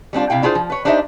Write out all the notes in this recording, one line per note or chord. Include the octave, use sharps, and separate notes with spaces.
G3 C4 D4 F4
C3 E4 F5 G5
D4 E4 F4 G#4 C5
F3
B4 C#5
D4 D#4 G4 C5 D#5 E5